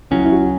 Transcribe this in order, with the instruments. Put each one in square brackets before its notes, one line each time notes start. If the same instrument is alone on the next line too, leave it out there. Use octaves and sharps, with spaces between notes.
[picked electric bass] C#2 C#3 F#3 C#4 [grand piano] E4
[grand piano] E4
F#4